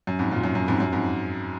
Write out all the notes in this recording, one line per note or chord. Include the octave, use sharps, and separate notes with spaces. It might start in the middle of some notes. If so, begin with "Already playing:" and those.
F#2
F2 G#2
F#2 A#2
F#2
F#2
F2 G#2
F#2
F2 G#2